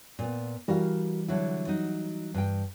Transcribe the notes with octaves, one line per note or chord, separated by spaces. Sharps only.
A#2 B3
E3 G3 F#4 A#4 F5
D3 F#3 E4
F#3 D#4
G2 G5